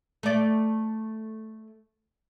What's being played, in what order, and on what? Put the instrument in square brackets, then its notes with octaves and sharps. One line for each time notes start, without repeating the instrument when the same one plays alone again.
[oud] A3 D5